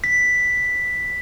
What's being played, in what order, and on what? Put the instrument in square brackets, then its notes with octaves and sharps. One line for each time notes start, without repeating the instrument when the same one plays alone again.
[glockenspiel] B6